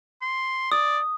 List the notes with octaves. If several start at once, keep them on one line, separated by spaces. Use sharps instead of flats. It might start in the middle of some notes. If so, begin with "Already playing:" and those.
C6
D5 D#6